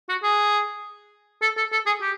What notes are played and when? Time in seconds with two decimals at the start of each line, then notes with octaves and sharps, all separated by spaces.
0.09 F#4
0.23 G#4
1.42 A4
1.57 A4
1.72 A4
1.86 G#4
2.02 G4